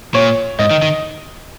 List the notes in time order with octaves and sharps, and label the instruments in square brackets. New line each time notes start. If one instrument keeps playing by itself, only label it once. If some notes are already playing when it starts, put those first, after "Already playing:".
[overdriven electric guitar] A#2 [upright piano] C#5
[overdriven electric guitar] G#2 [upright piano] D#5
[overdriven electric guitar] D#3
D#3